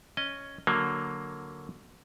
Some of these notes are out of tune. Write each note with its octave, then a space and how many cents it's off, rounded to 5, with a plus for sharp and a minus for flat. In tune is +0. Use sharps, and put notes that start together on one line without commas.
C#4 +0 D#5 -10
D3 +0 F#3 +0 A#3 +0